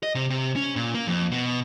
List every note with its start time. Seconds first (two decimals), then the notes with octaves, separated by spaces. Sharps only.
0.03 D#5
0.15 C3
0.30 C3
0.56 C#4
0.76 A#2
0.94 A#3
1.07 F2
1.32 B2